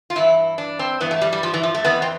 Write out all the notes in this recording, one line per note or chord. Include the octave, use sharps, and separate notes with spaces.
F4
G2 E3 E4
D4
C4
G2 E3 B3
A3
G3
G3
F3
E3
F3
A3
F2 E3 B3
C4